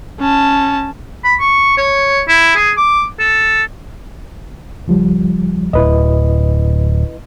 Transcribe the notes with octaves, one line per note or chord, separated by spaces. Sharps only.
C#4 A5
B5
C#6
C#5
E4
G#4
D6
A4
C#2 F3 G3
D1 E4 B4 D#5